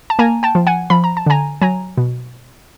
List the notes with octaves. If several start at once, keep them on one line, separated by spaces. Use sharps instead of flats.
A5
A#3 G#5 A#5
G5 A5
F3
F#5 G#5
F3 B5
A#5
A5
D3 G#5 A#5
F#3 G#5 A#5
B2